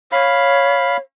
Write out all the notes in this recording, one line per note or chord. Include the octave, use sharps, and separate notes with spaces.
C#5 F5 B5